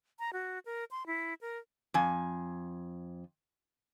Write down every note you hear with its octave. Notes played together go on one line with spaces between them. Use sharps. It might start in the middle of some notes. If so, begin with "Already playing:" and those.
A#5
F#4
A#4
C6
E4
A#4
F2 G#5